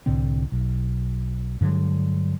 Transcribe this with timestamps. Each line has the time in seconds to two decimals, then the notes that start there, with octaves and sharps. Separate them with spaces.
0.06 C2 A2 D3 C4
0.52 B1
1.61 G2 D3 F#3 G#3